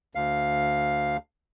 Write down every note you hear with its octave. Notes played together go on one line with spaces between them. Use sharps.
D2 F5